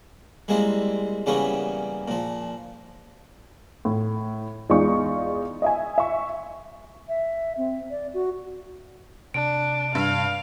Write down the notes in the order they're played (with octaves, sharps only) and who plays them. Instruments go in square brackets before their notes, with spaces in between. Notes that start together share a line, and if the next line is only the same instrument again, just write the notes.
[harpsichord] G3 G#3 A#3 C4 E4
C#3 E3 G3 A#3 B3 C#4
A#2 F3
[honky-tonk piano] A2
E2 G#3 D#4 F4 D5 C#6
D#5 E5 G#5
E5 C#6
[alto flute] E5
C4
D5
F#4
[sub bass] C3 [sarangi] D4 [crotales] D7
[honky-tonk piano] G2 [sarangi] F5